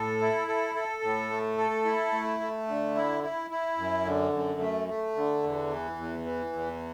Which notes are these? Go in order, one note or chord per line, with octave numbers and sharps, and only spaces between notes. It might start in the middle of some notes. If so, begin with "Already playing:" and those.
Already playing: A2 A4
E4
A4
A4
A2
A3
A4
E4
A3
A3
D3
E4
E4
E4
F#2
D3
F#2
A3
A3
D3
E2
E3
E2
E3
E2